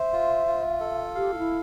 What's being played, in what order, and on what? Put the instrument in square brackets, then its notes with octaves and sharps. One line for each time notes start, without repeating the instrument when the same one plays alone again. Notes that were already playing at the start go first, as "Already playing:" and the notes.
Already playing: [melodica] C5 [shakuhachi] E5
[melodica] F4
F4
A4
[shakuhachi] G4 [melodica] F5
[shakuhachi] F4
E4